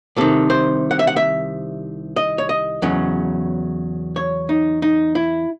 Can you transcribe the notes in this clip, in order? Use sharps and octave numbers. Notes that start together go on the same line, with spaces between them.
C2 C3 D#3 A4
C5
F#5
E5
F#5
E5
D#5
C#5
D#5
E2 C#3 F#3 C#4
C#5
D#4
D#4
E4